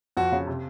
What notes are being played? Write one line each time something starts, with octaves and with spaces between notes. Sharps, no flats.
F2 F#4
C#3
C3